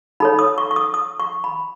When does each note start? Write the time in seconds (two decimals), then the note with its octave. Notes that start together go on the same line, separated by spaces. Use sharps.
0.20 D#4 A4 C#5 B5
0.39 D#6
0.58 C#6
0.71 C#6
0.76 D#6
0.94 D#6
1.20 C#6
1.44 B5